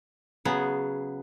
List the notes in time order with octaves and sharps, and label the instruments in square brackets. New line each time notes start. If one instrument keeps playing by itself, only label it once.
[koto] C#3 F#3 B3 G#4